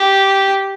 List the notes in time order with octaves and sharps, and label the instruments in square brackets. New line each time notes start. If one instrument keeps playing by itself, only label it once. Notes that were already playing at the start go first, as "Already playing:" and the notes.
Already playing: [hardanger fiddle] G4